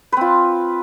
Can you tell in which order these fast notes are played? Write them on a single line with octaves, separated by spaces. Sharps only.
B4 C4 F4